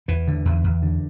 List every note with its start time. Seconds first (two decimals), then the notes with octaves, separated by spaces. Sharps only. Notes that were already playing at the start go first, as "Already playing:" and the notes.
0.08 E2 E3
0.28 D3
0.45 E2
0.64 E2
0.83 D3